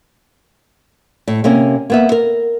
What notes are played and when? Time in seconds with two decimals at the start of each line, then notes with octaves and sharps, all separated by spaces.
1.27 A2
1.44 C3 A#3 C#4 A#4
1.90 A#3 B3 E5
2.12 A#4